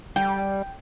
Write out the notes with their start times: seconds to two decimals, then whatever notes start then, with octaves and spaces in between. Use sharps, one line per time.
0.16 G3 G5